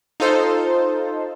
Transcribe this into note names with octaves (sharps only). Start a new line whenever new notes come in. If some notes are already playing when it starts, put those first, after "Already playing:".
D#4 F4 A4 C5